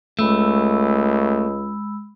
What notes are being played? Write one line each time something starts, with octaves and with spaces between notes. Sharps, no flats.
C#2 G#3 A3 B5 E6